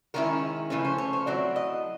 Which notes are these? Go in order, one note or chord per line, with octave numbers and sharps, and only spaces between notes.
D#3 G#3 C#4 E4 A#4
C#3 F3 A3 C#4 B4
C5
C#5
C5
F#3 A3 C4 E4 D5
D#5